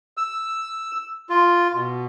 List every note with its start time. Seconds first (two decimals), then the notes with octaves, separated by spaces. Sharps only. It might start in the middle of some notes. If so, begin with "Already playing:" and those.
0.17 E6
1.30 F4
1.74 B2